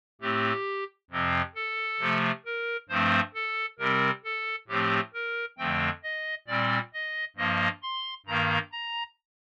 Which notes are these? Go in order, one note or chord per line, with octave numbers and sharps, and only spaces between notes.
A2 A3 C4 G4
F2 C3 F3 C4
A4
C3 F3 A3
A#4
G2 F3 A3 C4 C5
A4
C3 G3 C4 A#4
A4
A2 F3 A3 C4 G4
A#4
F2 D3 F3 A3 C4 G5
D#5
A#2 G3 C4 D5
D#5
G2 F3 A#3 D#5
C6
G2 D#3 A#3 A#5
A#5